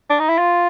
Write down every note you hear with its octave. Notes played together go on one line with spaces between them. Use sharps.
D4
D#4
E4
F4